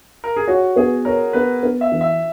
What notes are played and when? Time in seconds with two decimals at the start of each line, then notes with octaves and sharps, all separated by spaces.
0.24 A#4
0.36 G#4
0.47 F#4 C#5
0.76 B3 G#4
1.05 A#4 C#5
1.33 B3 B4
1.63 B3
1.81 E5
1.92 E3
2.01 E5